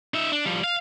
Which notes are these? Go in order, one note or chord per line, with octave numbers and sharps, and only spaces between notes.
D#4 E5
D4
F3 G3
F5